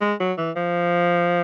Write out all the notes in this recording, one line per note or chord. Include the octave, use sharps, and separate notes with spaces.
G#3
F#3
E3
F3